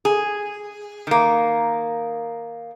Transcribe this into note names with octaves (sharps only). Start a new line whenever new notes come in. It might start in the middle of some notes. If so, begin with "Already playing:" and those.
G#4
D#3 A#3